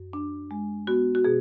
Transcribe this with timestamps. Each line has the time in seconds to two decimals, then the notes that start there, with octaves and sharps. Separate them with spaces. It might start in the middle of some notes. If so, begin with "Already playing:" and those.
Already playing: F#2
0.13 D4
0.51 G#3
0.87 B3 F#4
1.15 F#4
1.24 B2 G#4